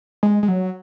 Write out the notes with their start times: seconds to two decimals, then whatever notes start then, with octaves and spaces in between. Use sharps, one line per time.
0.23 G#3
0.43 G#3
0.48 F#3